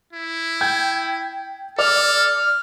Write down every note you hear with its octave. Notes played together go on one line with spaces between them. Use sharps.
E4
G5 G6 G#6
A4 D5 F6